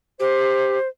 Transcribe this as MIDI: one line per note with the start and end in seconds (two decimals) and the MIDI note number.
0.20 0.78 67
0.20 0.88 72